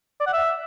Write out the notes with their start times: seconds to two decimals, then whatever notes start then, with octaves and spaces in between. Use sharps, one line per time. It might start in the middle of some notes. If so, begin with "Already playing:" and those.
0.20 D5
0.27 F#5
0.33 E5